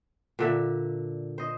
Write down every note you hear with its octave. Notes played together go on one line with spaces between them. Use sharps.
A#2 D3 E5
C5 D#5